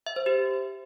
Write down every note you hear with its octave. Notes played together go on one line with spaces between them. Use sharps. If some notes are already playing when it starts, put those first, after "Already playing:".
E5
C5
G4